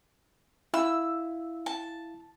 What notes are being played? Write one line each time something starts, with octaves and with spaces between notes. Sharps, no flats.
E4 F5 E6
A5